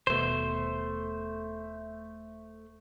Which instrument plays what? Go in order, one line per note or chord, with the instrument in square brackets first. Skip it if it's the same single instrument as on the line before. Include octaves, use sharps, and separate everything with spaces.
[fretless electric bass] D#1 B2 [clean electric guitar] A3 C5